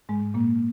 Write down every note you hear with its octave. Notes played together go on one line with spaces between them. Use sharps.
G#2 G#3
A#2 A#3